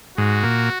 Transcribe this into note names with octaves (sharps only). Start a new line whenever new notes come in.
G#2 F#4
A#2